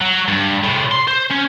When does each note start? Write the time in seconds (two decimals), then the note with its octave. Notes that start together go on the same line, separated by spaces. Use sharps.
0.01 F#3
0.28 G2
0.64 A2 C3
0.92 C6
1.08 C5
1.31 C#4